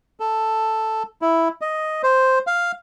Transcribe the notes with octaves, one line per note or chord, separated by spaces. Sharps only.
A4
E4
D#5
C5
F5